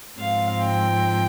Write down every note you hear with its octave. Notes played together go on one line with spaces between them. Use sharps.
G#2 F3 G#3 C4 F5
G5